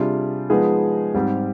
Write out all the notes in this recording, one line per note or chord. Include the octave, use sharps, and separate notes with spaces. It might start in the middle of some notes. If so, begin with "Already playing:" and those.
Already playing: C3 G3 D4 F4 G#4
F3 G#3 B3 D#4 G#4
G#2 G3 C4 G4